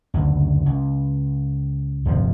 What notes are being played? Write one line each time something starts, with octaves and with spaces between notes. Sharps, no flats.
F#1 D2
C#2
D1 G1 C3 F3